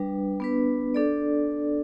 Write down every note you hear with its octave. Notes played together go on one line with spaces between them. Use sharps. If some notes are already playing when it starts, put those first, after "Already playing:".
Already playing: G3 D4 B4
B3 D4 B4
D4 A4 D5